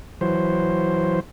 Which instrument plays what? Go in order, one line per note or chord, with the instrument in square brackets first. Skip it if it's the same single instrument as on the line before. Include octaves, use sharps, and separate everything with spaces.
[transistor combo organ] E3 F#3 C5